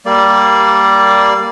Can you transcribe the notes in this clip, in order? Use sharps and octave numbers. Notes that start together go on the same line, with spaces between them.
G3 A#3 D5